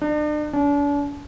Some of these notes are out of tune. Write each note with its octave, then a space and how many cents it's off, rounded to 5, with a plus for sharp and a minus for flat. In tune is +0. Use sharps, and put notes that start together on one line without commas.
D4 +40
D4 -40